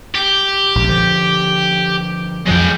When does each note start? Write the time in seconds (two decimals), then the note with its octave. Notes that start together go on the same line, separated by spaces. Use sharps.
0.15 G4
0.75 A#1 G#2
0.89 D3 F3
2.47 F2 F3 F#3 G#3 G5